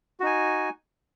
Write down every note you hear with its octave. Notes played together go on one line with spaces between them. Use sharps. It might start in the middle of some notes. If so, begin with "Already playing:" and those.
D#4 F#4 G#5